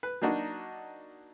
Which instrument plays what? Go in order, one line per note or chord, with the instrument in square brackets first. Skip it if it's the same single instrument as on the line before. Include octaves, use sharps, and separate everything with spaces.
[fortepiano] B4
F#3 A#3 D4 D#4 F#4